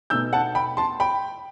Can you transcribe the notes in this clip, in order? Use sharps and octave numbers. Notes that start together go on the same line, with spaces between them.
B2 A3 D#4 E6 G6
F#5 A5
G5 B5
A5 C6
G5 B5